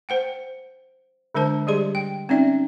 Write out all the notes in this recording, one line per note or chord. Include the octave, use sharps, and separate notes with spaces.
C5 F#5 G5
D3 G#3 D4 C5 A5
G3 G4 G#4 D5 C6
G5
C4 C#4 D#4 D5 E5